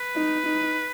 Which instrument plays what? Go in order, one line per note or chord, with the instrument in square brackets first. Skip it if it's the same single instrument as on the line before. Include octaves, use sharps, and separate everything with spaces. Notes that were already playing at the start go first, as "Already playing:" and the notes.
Already playing: [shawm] B4
[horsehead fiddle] D#4
D#4